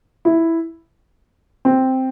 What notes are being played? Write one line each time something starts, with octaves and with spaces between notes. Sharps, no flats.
E4
C4